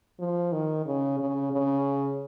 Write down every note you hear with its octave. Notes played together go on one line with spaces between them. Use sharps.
F3
D#3
C#3
C#3
C#3